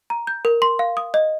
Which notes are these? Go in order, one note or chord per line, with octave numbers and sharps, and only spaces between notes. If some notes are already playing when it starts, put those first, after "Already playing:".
A#5
G6
A#4
C6
F5
D#6
D#5